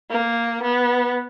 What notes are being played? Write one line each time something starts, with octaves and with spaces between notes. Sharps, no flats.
A#3
B3